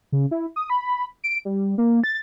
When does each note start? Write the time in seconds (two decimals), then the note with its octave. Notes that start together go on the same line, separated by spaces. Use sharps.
0.12 C#3
0.31 E4
0.56 D#6
0.70 B5
1.24 D7
1.45 G3
1.78 A#3
2.04 A6